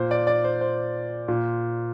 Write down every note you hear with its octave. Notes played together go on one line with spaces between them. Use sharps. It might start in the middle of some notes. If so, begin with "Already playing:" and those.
Already playing: A#2 C5
D5
D5
C5
C5
A#2